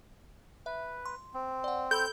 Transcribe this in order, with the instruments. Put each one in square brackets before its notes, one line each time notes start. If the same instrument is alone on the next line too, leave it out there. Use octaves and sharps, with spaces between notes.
[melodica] B4 [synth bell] E5
[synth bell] C6
[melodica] C4
[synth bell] D5 F#5
[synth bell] A4 B5 E6 [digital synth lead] G6